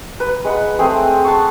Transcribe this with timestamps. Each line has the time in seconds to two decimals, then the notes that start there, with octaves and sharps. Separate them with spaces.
0.20 B4
0.44 G#3 F#5 B5
0.78 A3 C4 G#4 C6
1.24 F#5 A5 C6 C#6